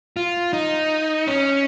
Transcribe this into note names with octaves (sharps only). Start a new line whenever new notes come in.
F4
D#4
C#4